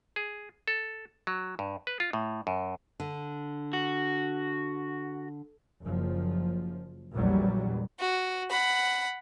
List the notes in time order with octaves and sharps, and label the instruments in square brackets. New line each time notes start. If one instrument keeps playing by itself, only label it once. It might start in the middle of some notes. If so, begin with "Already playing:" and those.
[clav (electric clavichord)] G#4
A4
F#3
G2
B4
F4
A2
F#2
[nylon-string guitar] D3
[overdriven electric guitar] F#4
[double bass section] F#1 F3
A#1 E2 F#3 G3
[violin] F#4
F#5 B5